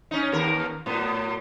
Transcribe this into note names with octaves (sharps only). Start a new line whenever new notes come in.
C#4 D#4
D#2 A#4
A2 F#3 B3